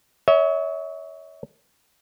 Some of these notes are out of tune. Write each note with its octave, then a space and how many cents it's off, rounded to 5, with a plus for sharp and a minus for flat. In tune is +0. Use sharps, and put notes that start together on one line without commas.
C#5 +20 E5 -40